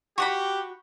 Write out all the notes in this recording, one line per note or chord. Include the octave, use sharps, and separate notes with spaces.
F#4 G4 F#5 B5 C#6